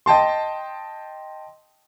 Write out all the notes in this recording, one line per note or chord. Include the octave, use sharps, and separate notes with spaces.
D#5 G5 A5 C6